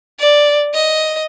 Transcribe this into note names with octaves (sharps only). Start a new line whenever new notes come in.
D5
D#5